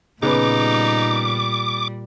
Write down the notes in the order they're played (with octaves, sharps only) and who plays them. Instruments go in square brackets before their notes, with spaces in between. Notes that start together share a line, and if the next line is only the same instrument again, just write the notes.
[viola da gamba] A#2 G3 [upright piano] C#3 B3 B4 [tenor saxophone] D#4 [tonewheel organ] D6